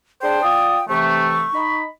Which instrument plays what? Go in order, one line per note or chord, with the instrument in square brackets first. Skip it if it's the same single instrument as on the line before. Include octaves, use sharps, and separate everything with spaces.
[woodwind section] D4 G#4 C5 [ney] G5
[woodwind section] F4 D5 D#6
[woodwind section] C3 E3 A3 [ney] C#6
[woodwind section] D#4 B5